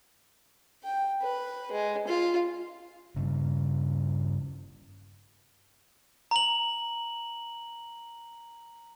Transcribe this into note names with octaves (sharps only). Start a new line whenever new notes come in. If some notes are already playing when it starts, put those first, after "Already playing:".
G5
B4
G#3
F4
G2 C#3
A#5 F#7